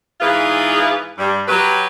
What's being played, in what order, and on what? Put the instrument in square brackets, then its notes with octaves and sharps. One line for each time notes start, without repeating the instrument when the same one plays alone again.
[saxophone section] G#2 E3 E4 F4 G#4 B4
G2 G3
F#3 G4 B4